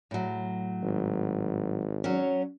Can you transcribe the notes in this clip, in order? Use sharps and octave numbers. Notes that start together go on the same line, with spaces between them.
A2 F#3
G#1
F#3 C#4